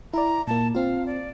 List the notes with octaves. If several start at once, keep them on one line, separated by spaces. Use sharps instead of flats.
E4 D5 A#5
A#2 A#3 A5
C4 F4 F5
D5